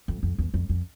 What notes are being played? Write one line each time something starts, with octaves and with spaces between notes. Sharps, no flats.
F2
F2
E2
F2
F2